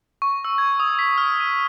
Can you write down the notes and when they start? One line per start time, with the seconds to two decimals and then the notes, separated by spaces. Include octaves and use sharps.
0.22 C#6
0.45 E6
0.58 G#6
0.80 D#6
0.99 B6
1.18 F6
1.40 D#7